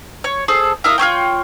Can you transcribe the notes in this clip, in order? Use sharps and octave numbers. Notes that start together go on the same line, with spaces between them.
C#5
G#4 A4 C5
E4 A#4 F5 D#6
F4 G#4 C#5 G5